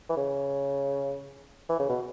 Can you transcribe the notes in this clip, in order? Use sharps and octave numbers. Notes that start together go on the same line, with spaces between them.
E3
C#3
E3
C#3
B2